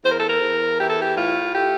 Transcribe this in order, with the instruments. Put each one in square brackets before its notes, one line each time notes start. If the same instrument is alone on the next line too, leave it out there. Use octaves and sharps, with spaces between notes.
[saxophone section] E2 C5
A#4
A4
A#4
E2
E3 G4
A4
G4
A2 F4
A3 G4